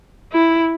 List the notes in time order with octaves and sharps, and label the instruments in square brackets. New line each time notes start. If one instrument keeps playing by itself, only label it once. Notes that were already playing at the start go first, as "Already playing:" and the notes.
[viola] E4